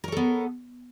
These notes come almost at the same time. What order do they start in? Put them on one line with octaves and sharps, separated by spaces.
A#4 C#5 A4 B3